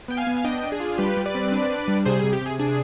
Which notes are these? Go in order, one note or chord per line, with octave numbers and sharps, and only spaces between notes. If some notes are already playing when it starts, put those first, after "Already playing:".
B3 G5
F5 G#5
B3
F5
D4 D#5 G5
D4
G#4
F4
G3 G4 B4
G3
B4 D5
C4
D4
D4
G3
C3 G#4 C5
C3 G#4
G4
C3 G#4
D4 G#4